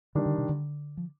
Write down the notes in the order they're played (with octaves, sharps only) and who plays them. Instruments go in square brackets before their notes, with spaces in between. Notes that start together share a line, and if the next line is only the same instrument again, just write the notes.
[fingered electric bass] D3 [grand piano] D#3 G3 D4
[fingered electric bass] D3
C3
D3
F3